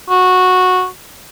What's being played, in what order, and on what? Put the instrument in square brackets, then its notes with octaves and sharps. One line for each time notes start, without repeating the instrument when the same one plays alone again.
[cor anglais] F#4